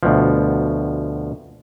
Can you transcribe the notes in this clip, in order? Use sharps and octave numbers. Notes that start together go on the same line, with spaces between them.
D2 B2 F3